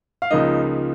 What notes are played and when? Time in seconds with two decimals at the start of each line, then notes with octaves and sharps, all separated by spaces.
0.22 F5
0.31 C#2 C#3 F3 A#3 D#4 D#5